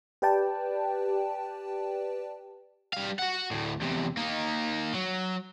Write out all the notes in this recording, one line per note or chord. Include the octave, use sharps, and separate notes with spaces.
G4 B4 D5 G5 A5
G3 F5
F#4 F#5
D2 A2
E2 C3
A#3 D#4
F#3